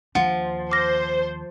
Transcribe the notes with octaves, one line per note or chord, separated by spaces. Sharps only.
D#2 F3 F#5
C5 D6 F6 A#6